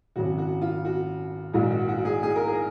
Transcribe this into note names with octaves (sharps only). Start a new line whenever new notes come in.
G#1 F#2 C#3 F#4
F#4
F4
F#4
A#1 G#2 D#3 F#4
F#4
F#4
G#4
G#4
A#4
G#4